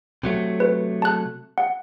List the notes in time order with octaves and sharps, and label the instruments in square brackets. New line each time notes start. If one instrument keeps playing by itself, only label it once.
[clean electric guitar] C3 F#3 A3
[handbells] B4
A5 F#6
F#5